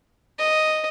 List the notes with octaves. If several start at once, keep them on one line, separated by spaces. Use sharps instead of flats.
D#5